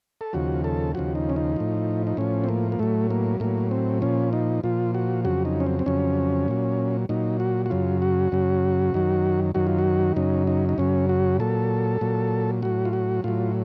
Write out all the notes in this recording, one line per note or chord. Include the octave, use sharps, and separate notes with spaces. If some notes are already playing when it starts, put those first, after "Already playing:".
A4
D#2 C#3 F3 F#4
A4
D#2 C#3 F3 F#4
D#4
C#4
D#4
A2 F3
D#4
A2 F3 C#4
C4
A#3
A#3
A2 F#3 A3
A#3
A2 F#3 A#3
C4
A#2 F3 C#4
D#4
A#2 F3 F4
F#4
F2 C#3 F#3 F#4
D#4
C#4
C4
C4
F2 C#3 F#3 C#4
A#2 F#3
A#2 F#3 D#4
F#4
F#4
F#2 C#3 F#3 F4
F#4
F#2 C#3 F#3
F#2 D#3 F#3
F#2 D#3 F#3 F#4
F4
F#4
F#2 C#3 F#3 D#4
D#4
D#4
F#2 C#3 F#3 C#4
F#4
A#2 F#3 A4
A#2 F#3
A2 F#3 F#4
F4
F#4
A2 F#3 F4